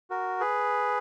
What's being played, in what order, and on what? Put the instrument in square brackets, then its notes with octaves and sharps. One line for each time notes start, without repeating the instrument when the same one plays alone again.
[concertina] F#4 A#4
G#4 B4